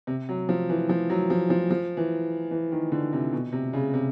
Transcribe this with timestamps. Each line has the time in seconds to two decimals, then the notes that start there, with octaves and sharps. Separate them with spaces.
0.07 C3
0.29 F#3
0.49 F3
0.69 E3
0.89 F3
1.10 F#3
1.30 F3
1.50 F3
1.70 F3
1.97 E3
2.51 E3
2.72 D#3
2.92 D3
3.13 C3
3.33 B2
3.52 C3
3.73 C#3
3.94 C3